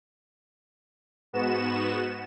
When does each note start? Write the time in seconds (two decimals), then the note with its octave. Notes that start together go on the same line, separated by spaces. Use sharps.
1.33 G#2 B3 F#4 E7